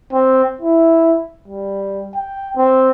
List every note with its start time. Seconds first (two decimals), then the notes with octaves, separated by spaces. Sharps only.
0.13 C4
0.61 E4
1.48 G3
2.15 G5
2.57 C4